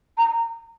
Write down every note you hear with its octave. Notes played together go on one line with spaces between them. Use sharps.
A#5